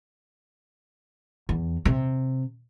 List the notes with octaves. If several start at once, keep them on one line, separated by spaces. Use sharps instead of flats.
E2
C3